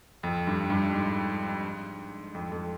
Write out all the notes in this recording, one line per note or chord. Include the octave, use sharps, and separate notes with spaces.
F2
G2
G2
G#2
F2
F2